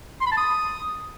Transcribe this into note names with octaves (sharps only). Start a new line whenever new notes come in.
C6
B5
A5
D#6